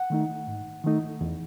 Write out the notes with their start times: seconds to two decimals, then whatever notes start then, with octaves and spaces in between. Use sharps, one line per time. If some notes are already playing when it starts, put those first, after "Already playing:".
Already playing: F#5
0.10 D#3 A3 D#4
0.47 G#2
0.84 D#3 A3 D#4
1.21 E2